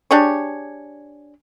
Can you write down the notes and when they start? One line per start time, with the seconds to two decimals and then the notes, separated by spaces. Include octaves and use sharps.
0.11 D4 G4 G#4 C#5